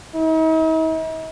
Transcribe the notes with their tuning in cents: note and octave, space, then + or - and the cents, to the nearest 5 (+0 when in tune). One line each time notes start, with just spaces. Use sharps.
D#4 +45